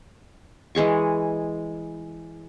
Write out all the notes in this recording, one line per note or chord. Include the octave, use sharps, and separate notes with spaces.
E3 G#3 G#4 C#6